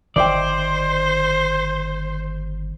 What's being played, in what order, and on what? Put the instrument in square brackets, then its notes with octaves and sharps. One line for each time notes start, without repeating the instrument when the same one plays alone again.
[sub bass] G1 [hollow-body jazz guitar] D#3 E5 G5 [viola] C5 [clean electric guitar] D5